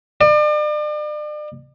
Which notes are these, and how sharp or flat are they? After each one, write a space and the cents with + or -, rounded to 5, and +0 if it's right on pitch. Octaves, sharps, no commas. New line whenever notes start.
D5 +40